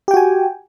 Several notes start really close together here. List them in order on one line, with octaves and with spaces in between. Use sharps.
G4 G5 F#4 G#5